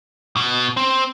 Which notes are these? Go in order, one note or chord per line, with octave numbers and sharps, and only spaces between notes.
B2
C4